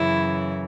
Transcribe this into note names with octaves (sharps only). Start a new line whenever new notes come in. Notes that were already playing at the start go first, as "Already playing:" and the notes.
Already playing: F#2 C#3 E3 E4